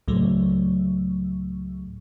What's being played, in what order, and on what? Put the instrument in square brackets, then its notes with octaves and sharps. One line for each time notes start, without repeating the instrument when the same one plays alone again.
[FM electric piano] C#2 A2 F#3 A3